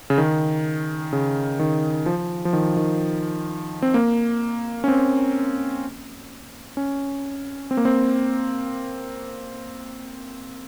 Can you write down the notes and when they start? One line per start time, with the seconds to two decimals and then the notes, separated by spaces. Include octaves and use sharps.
0.10 C#3
0.18 D#3
1.13 C#3
1.59 D#3
2.06 F3
2.45 F3
2.53 D#3
2.77 D#3
3.82 C4
3.94 A#3
4.84 C#4
4.88 C4
6.77 C#4
7.71 C4
7.77 A#3
7.85 C4